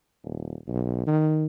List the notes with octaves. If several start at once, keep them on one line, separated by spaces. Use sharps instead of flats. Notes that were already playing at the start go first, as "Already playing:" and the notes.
D#1
B1
D#3